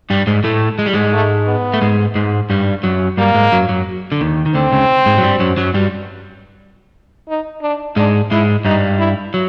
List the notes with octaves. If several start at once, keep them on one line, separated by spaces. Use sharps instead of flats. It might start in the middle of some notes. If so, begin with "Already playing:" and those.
G2 G3
G#2 G#3
A2 A3
G#3
G3
G#2 G#3
A3
B3
A3
G#2 G#3
G#2 G#3
G2 G3
F#2 F#3
G2 G3 A#3
G#2 G#3
F#2 F#3
F#2 F#3
D3
D#2 D#3
D#3
D2 D3 C4
C#2 C#3
G#2 G#3
F#3
G2 G3
F#2 F#3
F#2 F#3
G2 G3
D#4
D4
G#2 G#3 D4
G#2 G#3 E4
G2 G3 D#4
E4
F#3